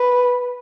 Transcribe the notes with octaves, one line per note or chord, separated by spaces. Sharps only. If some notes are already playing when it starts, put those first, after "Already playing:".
Already playing: B4